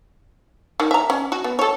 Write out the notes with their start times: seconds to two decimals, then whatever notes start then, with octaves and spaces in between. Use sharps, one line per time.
0.80 D#3
0.91 E5 A#5
1.10 C#4
1.32 F#4
1.44 B3
1.59 A4 C#5